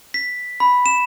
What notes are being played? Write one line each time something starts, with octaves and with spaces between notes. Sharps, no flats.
B6
B5
E7